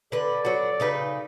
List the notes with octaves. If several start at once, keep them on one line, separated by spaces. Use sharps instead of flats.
D3 A4 B4 D5
F#3 F#4
C#3 D#4 B4